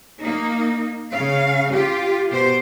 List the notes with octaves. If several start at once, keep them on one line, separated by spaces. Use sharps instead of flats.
A#3 D#4
C#3 F5
F4 G4
B2 G4 C5